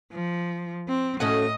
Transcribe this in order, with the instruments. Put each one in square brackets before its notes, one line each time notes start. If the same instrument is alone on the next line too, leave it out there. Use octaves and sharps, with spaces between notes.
[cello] F3
C4
[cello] A2 D#5 [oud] A3 C#4 F#4